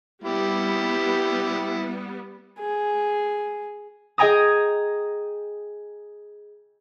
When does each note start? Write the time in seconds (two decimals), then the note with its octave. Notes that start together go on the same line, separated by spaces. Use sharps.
0.24 G3 B3 E4 G4
2.59 G#4
4.18 G#4 D#5 G5 G#5 A#5 D#6